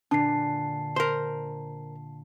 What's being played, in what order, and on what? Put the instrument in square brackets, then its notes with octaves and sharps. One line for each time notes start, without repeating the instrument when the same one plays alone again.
[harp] A#2 D3 [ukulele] D4 [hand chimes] A5 C7
[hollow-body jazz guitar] A#4 C5